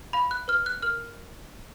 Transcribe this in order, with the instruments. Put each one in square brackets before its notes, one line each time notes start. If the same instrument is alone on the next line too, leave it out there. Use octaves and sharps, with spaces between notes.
[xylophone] F5 B5
F#6
B4 F6
F#6
A#4 F6